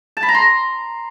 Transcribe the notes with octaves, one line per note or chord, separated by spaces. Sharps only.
A5
B5
A#5
C6